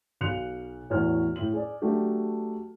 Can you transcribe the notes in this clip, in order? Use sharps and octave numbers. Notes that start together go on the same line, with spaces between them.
B1 F5 F#6 C#7 F7
E2 A2 F#4 C#5 F6
A2 F#7
G#4 D5
F#3 A3 D4 F#4 G4